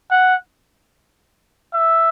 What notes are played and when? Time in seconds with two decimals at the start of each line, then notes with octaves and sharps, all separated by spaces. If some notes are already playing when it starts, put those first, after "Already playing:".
0.11 F#5
1.73 E5